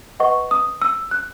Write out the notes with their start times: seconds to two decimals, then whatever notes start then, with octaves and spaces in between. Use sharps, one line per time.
0.20 B4 D#5 F#5 C#6
0.51 D#6
0.82 E6
1.11 F#6